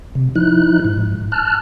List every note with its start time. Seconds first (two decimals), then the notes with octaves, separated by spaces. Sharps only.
0.15 C3
0.36 F3 D#4 E4 F#6
0.84 G#2
1.32 A5 F6 F#6